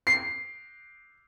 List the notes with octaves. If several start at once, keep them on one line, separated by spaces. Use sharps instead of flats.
C7